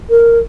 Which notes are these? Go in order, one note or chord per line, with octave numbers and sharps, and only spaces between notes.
A#4